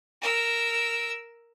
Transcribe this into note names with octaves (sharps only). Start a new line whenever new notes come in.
A#4 E6